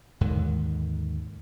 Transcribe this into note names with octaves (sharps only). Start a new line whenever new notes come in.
D#2 G#2 D3 D#3